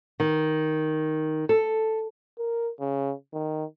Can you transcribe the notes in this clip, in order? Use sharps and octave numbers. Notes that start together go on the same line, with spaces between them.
D#3
A4
A#4
C#3
D#3